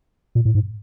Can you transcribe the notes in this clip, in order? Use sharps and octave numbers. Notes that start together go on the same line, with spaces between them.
A#2
A2
G#2